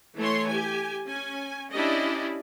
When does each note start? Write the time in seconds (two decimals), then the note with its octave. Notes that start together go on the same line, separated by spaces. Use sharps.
0.17 E3 A3 C#5 C6
0.49 G4 G#5
1.08 C#4 G#5
1.72 C#4 D4 E4 G4 D5 D#5